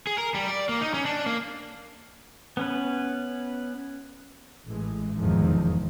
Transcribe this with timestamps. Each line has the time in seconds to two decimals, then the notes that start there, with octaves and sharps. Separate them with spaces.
0.07 G#4
0.18 A#4
0.34 G3
0.48 D5
0.69 A#3
0.81 D#4
0.94 C#4
1.06 D4
1.26 A#3
2.57 B3 C#4 B4
4.65 A1 A2 E3 G#3
5.18 F1 E2 G#2 D#3 F3